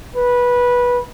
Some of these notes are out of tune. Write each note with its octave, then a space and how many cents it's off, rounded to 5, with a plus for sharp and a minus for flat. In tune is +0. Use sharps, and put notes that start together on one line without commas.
B4 -15